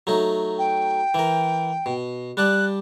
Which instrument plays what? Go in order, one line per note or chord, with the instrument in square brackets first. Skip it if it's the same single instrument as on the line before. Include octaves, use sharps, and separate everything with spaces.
[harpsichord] F#3 A3 D#4
[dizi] G5
[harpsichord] E3 A#4
B2
[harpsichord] G3 D5 A5 [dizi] F#6